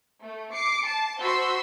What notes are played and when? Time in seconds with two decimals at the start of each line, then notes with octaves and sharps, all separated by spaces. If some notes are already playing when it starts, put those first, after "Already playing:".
0.21 A3
0.53 D6 C7 C#7
0.86 A5
1.20 F#4 C5 B5 C6 E6